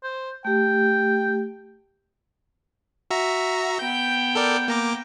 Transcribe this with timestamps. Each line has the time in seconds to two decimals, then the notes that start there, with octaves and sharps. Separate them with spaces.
0.04 C5
0.45 A3 G4 G5
3.11 F#4 E5 A#5
3.79 B3 G5 G6
4.35 A4 A#4 D5
4.68 A#3 A#5 D6